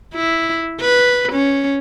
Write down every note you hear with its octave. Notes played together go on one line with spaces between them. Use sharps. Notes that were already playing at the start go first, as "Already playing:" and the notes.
E4
B4
C#4